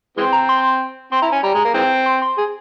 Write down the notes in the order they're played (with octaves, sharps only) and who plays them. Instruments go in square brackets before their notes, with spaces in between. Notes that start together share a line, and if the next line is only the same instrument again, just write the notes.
[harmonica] E3 G#3 C4 [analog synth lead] C6
[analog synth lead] A#5
C6
[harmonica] C4 [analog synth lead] C6
[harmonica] E4 [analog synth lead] A#5
[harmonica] C#4 [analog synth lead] G#5
[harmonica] G3 [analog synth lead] A#5
[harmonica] G#3
A#3
E3 G#3 C4
[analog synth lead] C6
C6
[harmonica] G#4